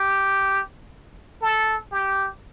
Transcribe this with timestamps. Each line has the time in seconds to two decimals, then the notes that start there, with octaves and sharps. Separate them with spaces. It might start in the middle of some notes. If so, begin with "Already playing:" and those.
Already playing: G4
1.41 A4
1.92 G4